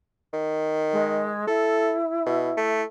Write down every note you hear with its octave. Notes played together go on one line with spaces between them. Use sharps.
D#3
G#3
E4 A4
B2
A3